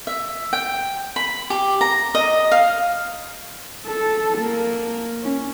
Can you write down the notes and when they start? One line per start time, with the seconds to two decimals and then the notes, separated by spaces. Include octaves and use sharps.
0.07 E5
0.53 G5
1.16 B5
1.50 G4
1.81 A#5
2.15 D#5
2.52 F5
3.87 A4
4.38 A#3
5.23 C#4